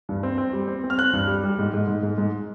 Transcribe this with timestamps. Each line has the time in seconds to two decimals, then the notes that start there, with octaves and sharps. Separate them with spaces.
0.09 G2
0.23 C4
0.38 C4
0.53 G3
0.68 C4
0.84 C4
0.90 F6
0.98 C4 F#6
1.13 G2
1.27 G3
1.44 G3
1.58 G#2
1.74 G#2
1.87 G#2
2.03 G#2
2.18 G#2